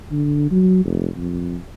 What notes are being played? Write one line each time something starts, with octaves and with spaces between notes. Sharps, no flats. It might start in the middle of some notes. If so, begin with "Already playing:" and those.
D3
F#3
F1
F2